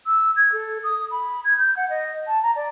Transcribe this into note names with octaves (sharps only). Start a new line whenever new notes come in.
E6
G#6
A4
D#6
B5
G#6
G6
F#5
D#5
A5
A#5
D5